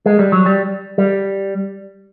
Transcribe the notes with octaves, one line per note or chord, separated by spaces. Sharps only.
G#3
G3
F#3
G3
G3